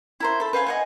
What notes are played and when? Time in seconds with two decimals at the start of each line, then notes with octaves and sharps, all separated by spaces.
0.20 E4 A#4 C5
0.40 A4 B5
0.53 B4 C5 F5 G#5
0.66 D#5 F#5 G#5